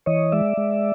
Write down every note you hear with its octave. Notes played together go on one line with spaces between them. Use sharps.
E3 C#5 D#5
G#3 D5 E5
G#3